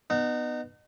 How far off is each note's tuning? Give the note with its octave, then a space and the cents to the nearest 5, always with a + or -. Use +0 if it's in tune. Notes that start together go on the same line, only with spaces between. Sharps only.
B3 +0 D#4 -30